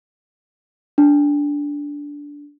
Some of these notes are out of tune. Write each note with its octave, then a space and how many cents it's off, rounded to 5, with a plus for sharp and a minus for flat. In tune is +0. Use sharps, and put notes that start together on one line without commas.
D4 -15